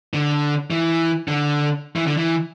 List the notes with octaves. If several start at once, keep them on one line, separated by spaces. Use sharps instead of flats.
D3
E3
D3
E3
D3
E3